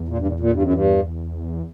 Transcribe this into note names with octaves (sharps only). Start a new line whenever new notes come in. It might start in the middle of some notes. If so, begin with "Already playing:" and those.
Already playing: E2
A#2
G2
A#2
A#2
G2
F#2
G2